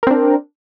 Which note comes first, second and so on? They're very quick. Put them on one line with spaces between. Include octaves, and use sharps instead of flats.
A#4 C4 D4